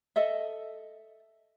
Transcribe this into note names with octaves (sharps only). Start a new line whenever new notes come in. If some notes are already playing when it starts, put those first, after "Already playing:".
A4 D#5 E5